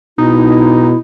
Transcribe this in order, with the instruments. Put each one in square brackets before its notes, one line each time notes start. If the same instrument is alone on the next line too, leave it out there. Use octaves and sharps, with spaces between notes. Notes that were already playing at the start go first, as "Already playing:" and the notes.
[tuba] B2 [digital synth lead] D#4 [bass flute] E4